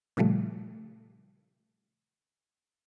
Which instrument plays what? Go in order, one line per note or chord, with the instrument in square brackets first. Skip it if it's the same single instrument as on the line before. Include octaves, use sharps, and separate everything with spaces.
[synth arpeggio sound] A#2 C#3 F3 G3 A3